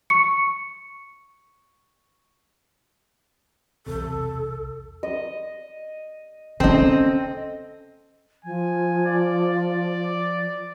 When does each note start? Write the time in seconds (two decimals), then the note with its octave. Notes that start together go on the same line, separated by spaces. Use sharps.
0.10 C#6 C#7
3.87 B1 E2 C3 A4
5.03 D#5
6.60 D3 C4 C#4 A4 D#5
8.45 F3 G#5
9.06 D5